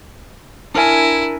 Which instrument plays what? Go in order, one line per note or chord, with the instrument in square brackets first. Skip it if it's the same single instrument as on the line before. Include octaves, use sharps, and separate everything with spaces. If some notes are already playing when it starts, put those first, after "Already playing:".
[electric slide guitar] D4 A#4 G#5 [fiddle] E4